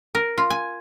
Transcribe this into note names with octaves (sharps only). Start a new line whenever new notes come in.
A#4
F4
G#5